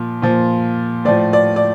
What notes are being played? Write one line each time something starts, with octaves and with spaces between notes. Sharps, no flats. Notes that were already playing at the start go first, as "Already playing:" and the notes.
Already playing: A#2 F3
A#2 F3
A2 F3 D5
D5
D5